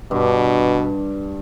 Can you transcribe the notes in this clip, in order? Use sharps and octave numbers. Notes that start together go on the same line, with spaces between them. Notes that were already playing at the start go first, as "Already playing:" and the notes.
G2 B2